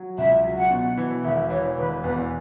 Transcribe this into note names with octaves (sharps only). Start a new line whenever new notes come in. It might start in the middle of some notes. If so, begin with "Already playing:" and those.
Already playing: F#3
C#2 E5
F#3
F#5
B2
E3
E1 E5
E3 C#5
E1 B4
E2 B4